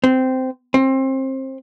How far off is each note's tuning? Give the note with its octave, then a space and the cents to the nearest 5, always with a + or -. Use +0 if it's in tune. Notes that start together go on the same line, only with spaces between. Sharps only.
C4 -15
C4 +25